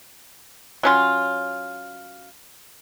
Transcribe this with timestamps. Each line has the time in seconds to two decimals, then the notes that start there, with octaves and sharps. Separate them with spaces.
0.83 F#3 C#4 F4